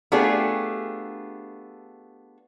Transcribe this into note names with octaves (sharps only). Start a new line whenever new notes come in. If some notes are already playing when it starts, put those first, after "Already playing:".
A3 B3 D4 F4 G4 G#4